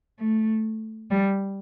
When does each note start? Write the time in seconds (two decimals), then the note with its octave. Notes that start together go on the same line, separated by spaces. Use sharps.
0.19 A3
1.11 G3